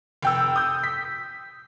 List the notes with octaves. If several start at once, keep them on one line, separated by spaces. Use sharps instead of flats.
F1 G5 E6
D#6 G6
B6